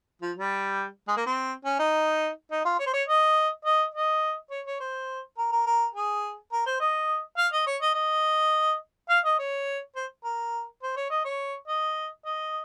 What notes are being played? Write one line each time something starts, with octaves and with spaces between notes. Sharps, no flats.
F3
G3
G#3
A#3
C4
C#4
D#4
D#4
F4
C#5
C5
C#5
D#5
D#5
D#5
C#5
C#5
C5
A#4
A#4
A#4
G#4
A#4
C5
D#5
F5
D#5
C#5
D#5
D#5
F5
D#5
C#5
C5
A#4
C5
C#5
D#5
C#5
D#5
D#5